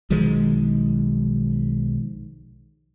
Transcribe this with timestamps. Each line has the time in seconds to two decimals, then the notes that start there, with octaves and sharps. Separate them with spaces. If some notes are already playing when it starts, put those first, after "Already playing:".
0.10 B1 D#3 F3 G#3